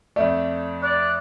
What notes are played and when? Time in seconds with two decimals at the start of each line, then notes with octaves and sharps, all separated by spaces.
0.16 F2 A3 D5
0.83 D5 F#6